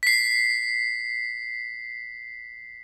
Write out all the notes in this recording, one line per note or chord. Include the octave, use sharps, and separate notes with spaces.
B6 C7